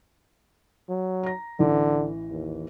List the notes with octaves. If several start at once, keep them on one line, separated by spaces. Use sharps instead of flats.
F#3
A#5 A#6
A1 D3 E3
D#2